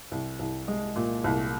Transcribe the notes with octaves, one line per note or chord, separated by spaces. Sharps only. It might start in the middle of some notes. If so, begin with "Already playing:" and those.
C2
C2
G#3
A#2
C2